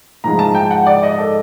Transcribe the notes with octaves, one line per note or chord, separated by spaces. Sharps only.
G#2 F3 G#3 A#5
A5
G5
F#5
D5
D#5
A4